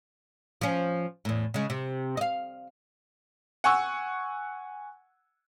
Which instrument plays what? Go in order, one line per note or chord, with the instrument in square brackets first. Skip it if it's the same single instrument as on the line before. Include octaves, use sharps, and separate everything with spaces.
[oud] F3 C#4
E2 A2
C#3 G#3
C3
D#5 F5
[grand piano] F#5 G#5 C#6 E6